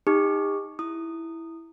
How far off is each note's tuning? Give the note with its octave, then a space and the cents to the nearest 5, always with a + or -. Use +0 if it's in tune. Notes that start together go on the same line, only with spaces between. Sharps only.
D#4 +0 G4 +40 D6 +25
E4 +0 D#6 -10